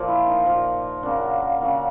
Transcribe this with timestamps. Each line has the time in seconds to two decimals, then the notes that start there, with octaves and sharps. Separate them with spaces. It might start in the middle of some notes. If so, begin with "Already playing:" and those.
Already playing: A#2 F3 A#3
0.08 E4
0.27 D#4
0.46 A#2 F3 A#3
1.03 C#3 F#3 A#3 D4
1.61 C#3 F#3 A#3